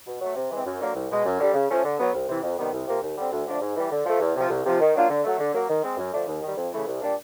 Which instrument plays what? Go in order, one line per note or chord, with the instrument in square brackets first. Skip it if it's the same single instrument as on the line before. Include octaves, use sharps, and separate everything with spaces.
[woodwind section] B2
F#3 A3
C3
E3 G#3 C4
F#2
D3 F#3 A#3
C2
B2 G#3
F#2
D3 G3
C#3
F3 A3 C#4
D3
F#3 B3
C2
C3 E3
F2
C3 D#3 G3 B3
C2
C3 F3 A#3
D#2
D3 G3 C4
D2
D3 F3 A3 D4
G#2
E3 G3
D3
F3 A3
E2
C3 F3
C2
C3 F3
D#3
F#3 A#3 D4 F4
D3
F#3 A3
D3
F#3 A#3
D#3
G#3 C4
F#2
D3 F3 A3 D4
D#2
D#3 G3
F2
C#3 E3 A3
C2
A#2 G3 A#3 D4